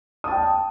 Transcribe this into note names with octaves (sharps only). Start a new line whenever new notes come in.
G5 A5 D#6